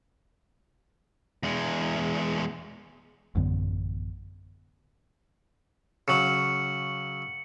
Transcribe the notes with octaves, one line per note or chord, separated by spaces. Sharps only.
E2 G#3
A1 F#2 D3 B3
C#3 F#3 C#7 F#7